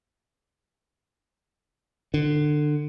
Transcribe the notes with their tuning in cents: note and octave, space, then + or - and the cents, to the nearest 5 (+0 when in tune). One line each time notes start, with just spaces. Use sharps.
D3 +25